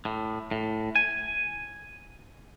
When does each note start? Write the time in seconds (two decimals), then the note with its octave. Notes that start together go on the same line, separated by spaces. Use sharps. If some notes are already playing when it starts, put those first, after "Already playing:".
0.05 A2
0.51 A2
0.96 G#5